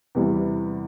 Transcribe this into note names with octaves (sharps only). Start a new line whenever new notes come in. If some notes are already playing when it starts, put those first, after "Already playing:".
E2 C3 E3 G3